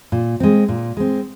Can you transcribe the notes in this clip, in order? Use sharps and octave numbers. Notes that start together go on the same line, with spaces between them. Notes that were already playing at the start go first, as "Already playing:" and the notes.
A#2
G#3 C4
A#2
G#3 C4